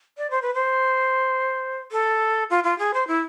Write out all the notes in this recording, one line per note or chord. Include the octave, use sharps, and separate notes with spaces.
D5
C5
B4
C5
A4
F4
F4
G#4
C5
E4